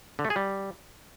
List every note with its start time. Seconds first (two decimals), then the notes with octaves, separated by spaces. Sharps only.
0.19 D3
0.25 A3
0.30 G#4
0.36 G3